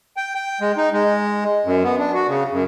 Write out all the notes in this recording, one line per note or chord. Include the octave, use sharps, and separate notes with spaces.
G5
G5
G#3
D#4
G#3
F#2
B3
D4
F#4
C#3
F#2